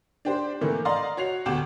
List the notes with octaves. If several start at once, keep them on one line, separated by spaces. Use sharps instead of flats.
D4 G4 C5
C3 D#3 E3 A3 A#3
D5 D#5 F5 A#5 C6
F#4 C#5 C7 F7
D2 B2 G4 F#5 D6 E7